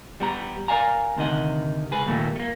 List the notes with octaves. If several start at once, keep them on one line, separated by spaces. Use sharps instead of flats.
G3 B3 G4 A#5
A#4 D5 F5 G#5 A#5
D2 C3 D#3 D#5 F#5
C#2 G#4 B4
D#2 A#2 G3 A3 A#3
A3 A#3